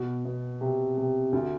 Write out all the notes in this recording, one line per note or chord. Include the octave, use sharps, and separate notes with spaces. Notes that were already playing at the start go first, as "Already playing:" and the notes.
Already playing: B2
B2
C3
C3
D2 D3